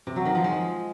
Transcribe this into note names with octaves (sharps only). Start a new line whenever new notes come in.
C3
F#3
D#3
F3
G#3